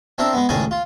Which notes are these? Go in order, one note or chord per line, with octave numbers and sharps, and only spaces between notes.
C4 D4 E4 A#4
G#3 B3
C#2 A2 D#3 G#4 D5 G#5
F4